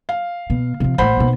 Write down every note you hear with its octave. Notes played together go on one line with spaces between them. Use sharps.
F5
B2
C3 F3
A1 A2 C5 F#5 B5
B1 B2